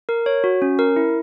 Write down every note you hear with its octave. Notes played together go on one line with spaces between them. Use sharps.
A#4
C#5
F#4
C#4
A#4
E4